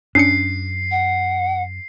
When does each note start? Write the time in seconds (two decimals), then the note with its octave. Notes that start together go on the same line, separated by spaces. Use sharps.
0.15 F#2 C#4 D4 C7 C#7
0.91 F#5